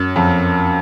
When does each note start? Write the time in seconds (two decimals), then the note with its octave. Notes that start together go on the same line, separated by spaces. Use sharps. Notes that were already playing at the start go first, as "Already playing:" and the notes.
Already playing: F#2
0.16 F2